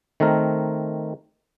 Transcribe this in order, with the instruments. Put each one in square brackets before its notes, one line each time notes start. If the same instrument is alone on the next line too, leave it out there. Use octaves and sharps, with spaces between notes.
[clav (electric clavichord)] D#3 A3 C4 A#4